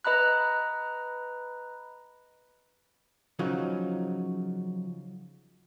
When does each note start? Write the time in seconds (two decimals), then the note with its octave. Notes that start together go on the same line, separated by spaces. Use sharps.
0.05 B4 D#5 A#5 B5 F#6
3.39 C#3 F3 F#3 D#4